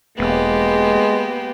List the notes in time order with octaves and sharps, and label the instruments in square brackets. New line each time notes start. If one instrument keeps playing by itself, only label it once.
[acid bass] E1 [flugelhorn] G#3 [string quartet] A#3 B3 G4